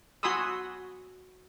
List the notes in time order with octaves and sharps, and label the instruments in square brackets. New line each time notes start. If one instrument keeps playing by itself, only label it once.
[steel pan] F#4 G#5 B5 C6 D#6 E6